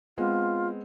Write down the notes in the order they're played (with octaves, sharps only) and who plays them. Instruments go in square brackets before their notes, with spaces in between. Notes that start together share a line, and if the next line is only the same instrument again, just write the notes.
[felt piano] G#3 B3 C4 [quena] F4